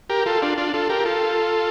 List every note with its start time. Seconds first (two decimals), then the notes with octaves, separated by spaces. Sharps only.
0.09 G4 A#4
0.26 F4 A4
0.42 D4 F4
0.58 D4 F4
0.73 F4 A4
0.89 G4 A#4
1.05 F4 A4